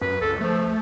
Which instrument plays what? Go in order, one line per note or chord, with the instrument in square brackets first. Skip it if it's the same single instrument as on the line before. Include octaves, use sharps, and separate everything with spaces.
[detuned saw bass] F#2 [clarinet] B4
[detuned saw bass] C#2 [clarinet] A4
[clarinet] F3 [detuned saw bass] A3